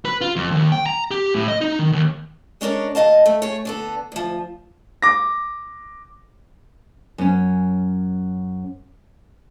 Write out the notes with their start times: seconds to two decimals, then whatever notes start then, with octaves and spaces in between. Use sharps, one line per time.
0.05 B4
0.21 F4
0.36 F2
0.51 D#2
0.72 G5
0.86 A#5
1.11 G4
1.35 A2
1.48 D#5
1.61 D#4
1.79 D#3
1.92 D#2
2.61 G#3 C#4 D4 A#4 C#5
2.95 D#2 A#3 D#5 F5 A5
3.26 A3
3.42 A3 G#4 C#5
3.65 D3 B3 A4
4.12 D2 F3
5.02 D6 A#6
7.18 F#2 C#4